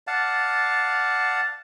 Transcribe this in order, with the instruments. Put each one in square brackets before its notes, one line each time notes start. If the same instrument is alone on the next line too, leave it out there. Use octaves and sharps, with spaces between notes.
[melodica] D5 F5 F#5 A5